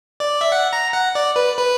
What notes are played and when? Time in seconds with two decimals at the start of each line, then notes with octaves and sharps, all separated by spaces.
0.20 D5
0.41 E5
0.52 F#5
0.73 A#5
0.93 F#5
1.15 D5
1.36 B4
1.57 B4